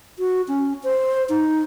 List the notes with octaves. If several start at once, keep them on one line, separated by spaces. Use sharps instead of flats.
F#4
C#4
C5
D#4